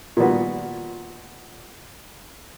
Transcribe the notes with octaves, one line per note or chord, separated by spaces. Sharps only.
A#2 D#3 F3 G3 B3 F#4